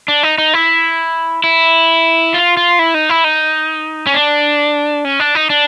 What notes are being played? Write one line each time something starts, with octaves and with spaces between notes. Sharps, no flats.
D4
D#4
D#4
E4
E4
F4
F4
E4
D#4
E4
D#4
C#4
D4
C#4
D4
D#4
D4